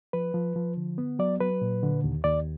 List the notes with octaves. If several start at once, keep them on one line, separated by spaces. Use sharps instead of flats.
F3 B4
F3
F3
D3
B3
F#3 D5
F#3 B4
A#2
D3
D#2
D#2 D5